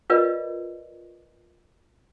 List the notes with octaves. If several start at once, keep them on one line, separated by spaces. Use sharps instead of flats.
F4 A#4 B4 D5 D#5